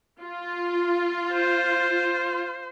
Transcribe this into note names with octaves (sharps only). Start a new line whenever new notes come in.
F4
C5